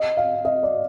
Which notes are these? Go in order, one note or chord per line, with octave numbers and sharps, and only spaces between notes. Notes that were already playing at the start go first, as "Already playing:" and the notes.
Already playing: D#5
F5
D#5
D5